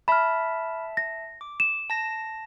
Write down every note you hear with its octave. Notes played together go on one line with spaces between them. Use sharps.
E5 A5 B5 F6
A#6
D6
E7
A5 A#6